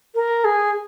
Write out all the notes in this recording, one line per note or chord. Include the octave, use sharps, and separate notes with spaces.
A#4
G#4